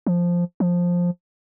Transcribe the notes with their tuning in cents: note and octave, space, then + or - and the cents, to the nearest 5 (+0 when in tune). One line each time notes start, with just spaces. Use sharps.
F3 +0
F3 +10